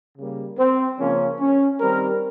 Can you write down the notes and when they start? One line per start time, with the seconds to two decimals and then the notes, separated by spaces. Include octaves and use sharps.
0.17 C#3 G3 A#3
0.59 C4
0.99 C#3 F3 A#3 C#4
1.40 C#4
1.80 D#3 G3 C4 A#4